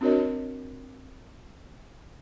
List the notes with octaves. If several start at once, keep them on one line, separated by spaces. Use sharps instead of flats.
C4 D4 F#4 A#4 C#5 D#5